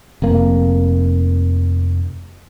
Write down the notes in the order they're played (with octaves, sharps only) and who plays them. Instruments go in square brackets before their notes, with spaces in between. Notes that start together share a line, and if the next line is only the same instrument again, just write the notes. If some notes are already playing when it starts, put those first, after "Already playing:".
[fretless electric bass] F1 F2 A#3